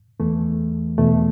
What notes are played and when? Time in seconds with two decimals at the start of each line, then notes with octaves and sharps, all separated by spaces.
0.20 E2 E3 A3
0.98 E2 B2 A3